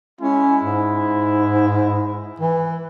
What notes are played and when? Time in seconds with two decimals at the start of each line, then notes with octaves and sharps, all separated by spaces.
0.21 G#3 C#4 E4
0.64 G#2
2.40 E3